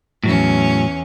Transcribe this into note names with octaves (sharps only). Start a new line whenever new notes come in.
E2 A2 F#3 C#4